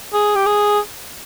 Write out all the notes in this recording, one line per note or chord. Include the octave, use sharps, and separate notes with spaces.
G#4
G4
G#4